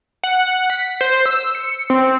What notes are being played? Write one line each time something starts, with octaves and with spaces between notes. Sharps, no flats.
F#5
B6
C5
E6
C#7
C4